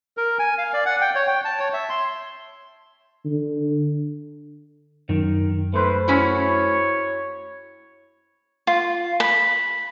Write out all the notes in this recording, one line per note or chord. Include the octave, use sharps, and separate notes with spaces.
A#4
G#5
F5
D5
F#5
G5
C#5
G5
A5
C#5
E5
C6
D3
F#2 D#3
A3 B4 C5
C#4 E4 F#4 C#5
F4
B5